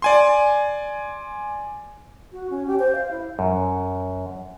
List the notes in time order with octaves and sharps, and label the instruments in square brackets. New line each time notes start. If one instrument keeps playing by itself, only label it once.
[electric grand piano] D5 G#5 C6
[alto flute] F#4
C#4
G4
C5
F5
E4
[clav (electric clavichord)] F#2